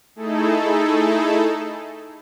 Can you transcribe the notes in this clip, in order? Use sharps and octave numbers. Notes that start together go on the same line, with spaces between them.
A3 D#4 E4 G#4 A4